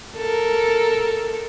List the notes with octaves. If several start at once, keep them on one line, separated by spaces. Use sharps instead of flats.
A4 A#4